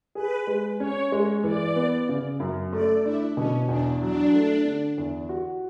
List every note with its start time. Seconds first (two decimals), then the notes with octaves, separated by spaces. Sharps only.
0.15 G#4 B4
0.47 G#3
0.79 C#4 C#5
1.12 G#3
1.44 E3 D5
1.76 B3
2.09 C#3
2.40 F#2
2.73 A3 D5
3.04 D4 E4
3.37 B2 C#4
3.69 E2 D4
4.02 F#3 D4
4.33 A3
4.65 D3
4.98 E2
5.29 F#4